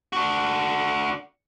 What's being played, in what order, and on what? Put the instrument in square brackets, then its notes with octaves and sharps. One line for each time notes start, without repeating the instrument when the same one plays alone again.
[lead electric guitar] D4 F#4